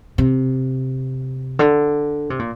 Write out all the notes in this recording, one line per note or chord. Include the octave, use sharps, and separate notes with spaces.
C3
D3
C3
A#2